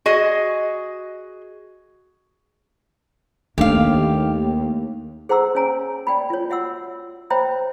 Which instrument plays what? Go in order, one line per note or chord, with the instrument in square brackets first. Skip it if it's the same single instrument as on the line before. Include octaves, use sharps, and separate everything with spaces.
[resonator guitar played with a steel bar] F#4 G#4 D#5
[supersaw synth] D#2 [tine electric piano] A3 [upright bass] A#3 D4 [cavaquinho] G4 F5
[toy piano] G#4 C5 F#5 A#5 C6 E6
C#4 C#5 G#5 A#5
D5 G5 B5
F4 C#5
F#4 E5 F#5 C6 E6
C5 C#5 E5 G5 A#5 B5